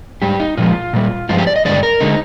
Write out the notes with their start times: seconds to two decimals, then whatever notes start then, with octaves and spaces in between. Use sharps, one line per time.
0.22 G#2 G3 G4
0.40 D#4
0.57 A#2 F3 G#3 F4
0.93 A#2 G3
1.29 G2 F3 G#3 F4
1.38 G4
1.47 D5
1.56 D#5
1.65 G2 D3 F3 G#3 D5
1.83 A#4
2.01 D3 G#3 D#4